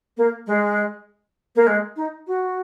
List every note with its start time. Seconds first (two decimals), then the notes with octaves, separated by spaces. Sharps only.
0.17 A#3
0.47 G#3
1.55 A#3
1.67 G#3
1.96 D#4
2.27 F#4